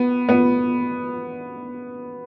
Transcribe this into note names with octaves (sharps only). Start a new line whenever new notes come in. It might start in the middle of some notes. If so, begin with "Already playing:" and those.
Already playing: B3
B3